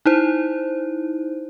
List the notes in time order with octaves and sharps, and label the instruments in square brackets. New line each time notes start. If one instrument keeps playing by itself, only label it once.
[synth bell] D#4 E4 C5